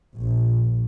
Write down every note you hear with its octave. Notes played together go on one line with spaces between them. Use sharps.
A#1